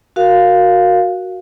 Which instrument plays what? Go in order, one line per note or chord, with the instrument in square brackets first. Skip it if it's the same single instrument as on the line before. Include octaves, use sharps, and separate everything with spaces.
[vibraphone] F#4 A#4 F5